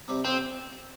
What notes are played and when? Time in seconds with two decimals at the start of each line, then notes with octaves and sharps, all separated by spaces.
0.08 C3 G3 C4 G4
0.25 F2 C4